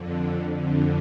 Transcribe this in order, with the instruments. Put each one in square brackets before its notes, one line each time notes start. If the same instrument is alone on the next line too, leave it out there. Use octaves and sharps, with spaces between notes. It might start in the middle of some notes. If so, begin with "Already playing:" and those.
Already playing: [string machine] F2 D3
F2 D3